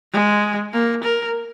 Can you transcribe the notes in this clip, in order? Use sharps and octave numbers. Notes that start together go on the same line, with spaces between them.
G#3
A#3
A#4